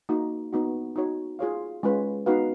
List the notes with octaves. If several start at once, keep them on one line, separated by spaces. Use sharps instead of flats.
A#3 D#4 F#4
B3 D#4 F#4
D#4 F#4 C#5
F4 G#4 C#5 F5
G#3 C#4 F4 B4
B3 D#4 F#4 B4 F5